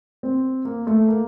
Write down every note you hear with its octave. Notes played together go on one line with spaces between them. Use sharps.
C4
A#3
A3
A#3